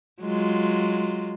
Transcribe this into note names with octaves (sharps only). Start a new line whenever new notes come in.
F#3 G#3 F4